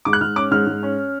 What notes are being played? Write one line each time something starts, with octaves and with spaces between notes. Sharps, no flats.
G#2 D6
F#6
G#2 F6
C#4 D6
G#2 F6
G#2
C#4